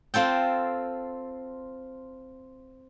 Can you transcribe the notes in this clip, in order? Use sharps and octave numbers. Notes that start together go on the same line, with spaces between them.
C4 F4 A4 G5